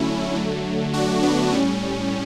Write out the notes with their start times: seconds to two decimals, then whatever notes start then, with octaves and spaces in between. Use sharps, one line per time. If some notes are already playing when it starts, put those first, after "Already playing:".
Already playing: D3 F#3 A3 C#4 E4
0.35 D3 F#3 A3
0.94 D4 F#4
1.23 B3 D4
1.52 A2 G3 C#4